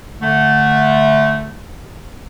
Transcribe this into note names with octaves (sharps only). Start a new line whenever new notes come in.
D3 A3